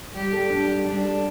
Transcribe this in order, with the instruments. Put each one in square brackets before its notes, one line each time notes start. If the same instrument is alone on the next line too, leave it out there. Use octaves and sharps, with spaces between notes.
[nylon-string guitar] G3 [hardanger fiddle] G4
[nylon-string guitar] A4
D4
G3
[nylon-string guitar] G3 [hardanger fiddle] D4
[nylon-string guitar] A4